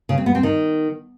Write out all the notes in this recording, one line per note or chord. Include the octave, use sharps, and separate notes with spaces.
C#3
C4
B3
C4
D#3